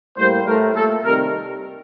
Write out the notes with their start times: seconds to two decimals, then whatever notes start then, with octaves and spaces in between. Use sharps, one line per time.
0.18 A2 G3 A#3 C5
0.46 A2 A3 A#4
0.75 A#2 A3 A4
1.04 C3 D#3 G3 A#4